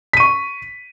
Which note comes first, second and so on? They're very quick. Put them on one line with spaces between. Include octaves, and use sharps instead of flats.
B6 D#7 C#6